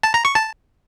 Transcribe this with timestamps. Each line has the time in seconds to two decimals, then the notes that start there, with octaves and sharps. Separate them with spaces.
0.03 A5
0.14 A#5
0.25 C#6
0.35 A5